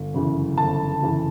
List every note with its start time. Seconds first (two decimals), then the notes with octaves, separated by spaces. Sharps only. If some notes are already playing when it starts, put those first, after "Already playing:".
Already playing: G1
0.14 F#2 C#3 E3
0.57 G1 A5
1.02 F#2 C#3 E3